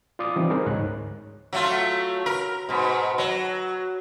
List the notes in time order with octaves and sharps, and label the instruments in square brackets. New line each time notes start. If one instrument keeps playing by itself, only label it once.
[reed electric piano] F4 D5 D6 D#6
E3 G3 C4 C#4 D#4
D#4 G#4 A#4 C5
D2 G#2 C#5 F#6
[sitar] F#3 A3 F4
A#4
G#2 B2
F#3